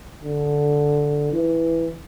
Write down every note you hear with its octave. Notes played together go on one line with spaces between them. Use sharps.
D3
E3